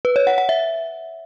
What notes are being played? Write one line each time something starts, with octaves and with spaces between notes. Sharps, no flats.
B4
C#5
F#5
F#5
E5